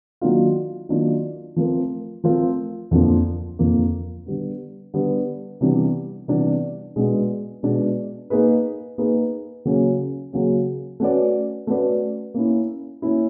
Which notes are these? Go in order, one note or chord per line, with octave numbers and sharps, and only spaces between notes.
D#3 F#3 A#3 D4 F4
D#3 F#3 A#3 D4 F4
F3 A3 C4 F4 A#4
F3 A3 C4 F4 A#4
F2 D3 F3 A#3
F2 D3 F3 A#3
D3 G3 B3
D3 G3 B3
C3 E3 G3 B3 D4
C3 E3 G3 B3 D4
B2 G#3 B3 D4
B2 G#3 B3 D4
A#3 D#4 G#4 B4
A#3 D#4 G#4 B4
C#3 F#3 A#3 C#4
C#3 F#3 A#3 C#4
A3 C#4 F#4 B4 D5
A3 C#4 F#4 B4 D5
A#3 C#4 E4
A#3 C#4 E4